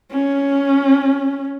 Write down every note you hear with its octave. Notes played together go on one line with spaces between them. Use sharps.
C#4